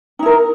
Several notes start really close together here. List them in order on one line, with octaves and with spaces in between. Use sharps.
D#4 E4 A#4